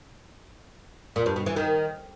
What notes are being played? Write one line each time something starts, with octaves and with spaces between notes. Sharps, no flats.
A#2
G2
B2
E3
D#3